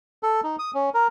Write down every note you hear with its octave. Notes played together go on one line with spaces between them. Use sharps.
A4
D#4
D#6
C#4
A#4